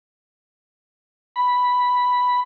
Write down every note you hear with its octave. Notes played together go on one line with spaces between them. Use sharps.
B5